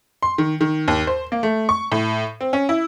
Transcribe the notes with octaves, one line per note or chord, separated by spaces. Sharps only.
C6
D#3
D#3
D#2
C5
A#3
A3
C#6
A2
C4
C#4
E4